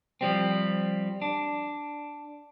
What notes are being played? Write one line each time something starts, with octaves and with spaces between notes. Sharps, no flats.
F3 G3 C4
D4